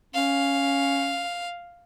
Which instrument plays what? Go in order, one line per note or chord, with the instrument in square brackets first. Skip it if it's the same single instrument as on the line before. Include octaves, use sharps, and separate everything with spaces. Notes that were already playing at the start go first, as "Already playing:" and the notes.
[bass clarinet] C#4 [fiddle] F5